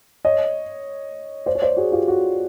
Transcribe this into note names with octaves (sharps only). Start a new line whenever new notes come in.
C#5 D#5
C5 D5
C#5
C5 D5
F#4 G#4
F4 G4
F#4